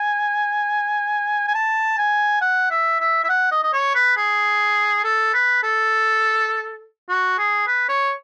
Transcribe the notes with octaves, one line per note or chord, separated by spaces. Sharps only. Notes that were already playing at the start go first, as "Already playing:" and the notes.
Already playing: G#5
G#5
A5
G#5
F#5
E5
E5
E5
F#5
D#5
D#5
C#5
B4
G#4
A4
B4
A4
F#4
G#4
B4
C#5